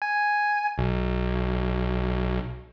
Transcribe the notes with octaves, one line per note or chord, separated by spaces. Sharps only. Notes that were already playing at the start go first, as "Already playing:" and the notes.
G#5
B1